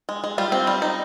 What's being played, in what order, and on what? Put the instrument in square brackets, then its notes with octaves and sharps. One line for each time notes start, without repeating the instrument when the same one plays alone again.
[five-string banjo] G#3
G#3
G3 F4
C4
G3
D#4